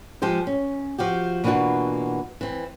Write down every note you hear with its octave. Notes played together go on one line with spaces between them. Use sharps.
F3 G#3 G4 C5
C#4
F3 F#4 G4
B2 E3 A#3 D4 F4 F#4
E3 C4